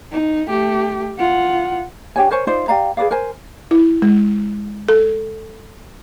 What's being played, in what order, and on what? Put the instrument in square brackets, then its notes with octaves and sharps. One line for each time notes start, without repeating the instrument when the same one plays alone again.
[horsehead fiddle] D#4
A3 G4
F4 F#5
[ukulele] D4 G4 C#5 G#5
A#4 C5 C#5 G#5
D#4 F4 C5 D5
G4 D5 F5 A#5
G#4 B4 D5 F5
A#4 C5 G#5
[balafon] E4
G#3
A4